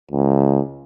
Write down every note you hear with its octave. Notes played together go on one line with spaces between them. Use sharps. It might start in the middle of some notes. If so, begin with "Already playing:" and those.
C#2